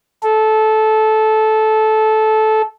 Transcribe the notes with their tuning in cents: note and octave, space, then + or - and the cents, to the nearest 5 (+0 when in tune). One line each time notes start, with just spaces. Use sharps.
A4 -15